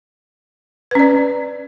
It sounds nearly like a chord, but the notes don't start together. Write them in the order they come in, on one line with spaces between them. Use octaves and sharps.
B4 C#4 D5